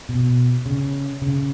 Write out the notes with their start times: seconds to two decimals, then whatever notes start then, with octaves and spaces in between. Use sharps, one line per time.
0.09 B2
0.66 C#3
1.22 C#3